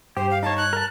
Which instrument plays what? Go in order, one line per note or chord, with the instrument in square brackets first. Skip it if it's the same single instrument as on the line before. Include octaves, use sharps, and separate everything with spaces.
[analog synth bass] G2 [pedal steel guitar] G4 [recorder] C5
[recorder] F5
[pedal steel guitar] D#4 C#5 [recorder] A5
[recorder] F#6
[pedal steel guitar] A#4 A5